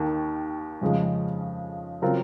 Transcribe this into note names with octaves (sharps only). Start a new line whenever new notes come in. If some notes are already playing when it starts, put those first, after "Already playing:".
Already playing: D#2 D#3 A#3
F2 C#3 F3 G#3
C#3 F#3 C4 F4 A#4